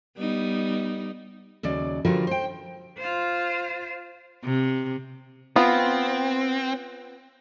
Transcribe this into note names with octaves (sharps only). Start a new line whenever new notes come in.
G3 B3 D#4
D#2 C#3 F#3 D5
D3 F3 G3 F4 F#4 A#4
C5 G5
F4 C5
C3
B3 C4 F4